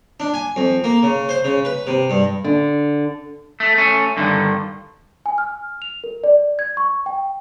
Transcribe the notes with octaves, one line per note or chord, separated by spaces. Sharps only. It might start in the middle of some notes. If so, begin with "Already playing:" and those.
D4
G#5
F2
A#3
C#3
C5
C#3
B4
C3
G2
D3
A3
A3 C#4
G2 D3 D#3
G#5
F6
F7
A#4
D5
G#6
C#6
G5